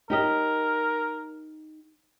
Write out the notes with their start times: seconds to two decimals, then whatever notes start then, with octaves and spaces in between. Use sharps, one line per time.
0.10 D#4 G4 A#4 D#5